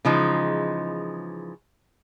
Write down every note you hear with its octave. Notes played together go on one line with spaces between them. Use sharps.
C#3 E3 F3 G#3 D#4